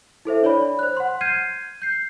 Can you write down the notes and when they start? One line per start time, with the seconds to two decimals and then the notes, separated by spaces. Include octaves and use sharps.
0.25 E4 A4 C5 E5
0.43 D4 C#5 D5 B5
0.79 C5 F#6
0.97 F#5 C6
1.21 F6 G6 G#6 C7 D#7
1.82 G6 C7